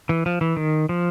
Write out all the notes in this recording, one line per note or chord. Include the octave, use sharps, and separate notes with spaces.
E3
F3
E3
D#3
F3